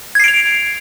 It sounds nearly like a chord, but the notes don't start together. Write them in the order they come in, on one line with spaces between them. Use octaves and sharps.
G#6 C7 D7 F7